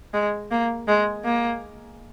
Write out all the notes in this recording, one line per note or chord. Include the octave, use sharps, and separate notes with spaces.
G#3
A#3
G#3
A#3